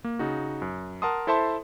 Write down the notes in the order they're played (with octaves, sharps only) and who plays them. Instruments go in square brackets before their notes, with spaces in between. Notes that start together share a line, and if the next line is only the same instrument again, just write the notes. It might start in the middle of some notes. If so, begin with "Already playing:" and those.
[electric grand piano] A#3
C#3 D#4 F#4
F#2
A#4 F#5 A5 C6 D#6
E4 A4 C5 E5 A5 C6